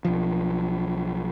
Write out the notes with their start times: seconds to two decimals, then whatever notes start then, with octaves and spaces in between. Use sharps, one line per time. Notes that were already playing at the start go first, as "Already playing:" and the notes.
0.05 B1 F3